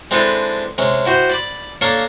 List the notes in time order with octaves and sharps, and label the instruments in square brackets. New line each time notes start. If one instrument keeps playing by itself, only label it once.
[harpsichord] G#3 C4 D4 E4 A4 B4
C3 G#3 C#4
E4 F#4 G4 C5
D5 B5 D6
A#3 D4 A4 A#4 C#5 F5